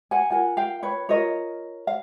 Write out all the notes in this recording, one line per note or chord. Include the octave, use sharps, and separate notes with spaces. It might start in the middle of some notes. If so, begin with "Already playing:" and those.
F#5 G#5
F4 A#4 F#5 G#5
F5 G5
B4 C#5
F4 A#4 C#5 D#5
F5